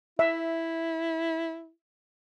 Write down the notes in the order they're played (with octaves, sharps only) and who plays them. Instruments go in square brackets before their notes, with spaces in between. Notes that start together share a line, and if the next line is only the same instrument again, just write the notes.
[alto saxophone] E4 [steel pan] E5